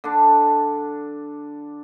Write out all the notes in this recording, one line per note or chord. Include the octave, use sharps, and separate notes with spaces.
D3 D4